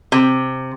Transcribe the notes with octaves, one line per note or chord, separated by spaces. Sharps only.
C3